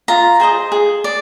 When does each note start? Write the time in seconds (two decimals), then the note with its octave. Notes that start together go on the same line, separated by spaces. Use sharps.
0.08 F4 A#5
0.40 G#4 C5 D#5
0.72 G#4
1.04 D5